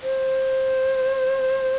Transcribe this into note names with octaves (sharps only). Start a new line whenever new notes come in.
C5